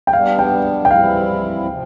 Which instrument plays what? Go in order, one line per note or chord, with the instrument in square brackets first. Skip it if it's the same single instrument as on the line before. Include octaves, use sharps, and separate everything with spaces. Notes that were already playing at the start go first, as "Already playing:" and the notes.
[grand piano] G5
[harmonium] G3 B3 D4 [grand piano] F5
[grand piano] G5
G5
[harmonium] E3 G3 C4 E4 [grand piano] F5
[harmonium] C3 F3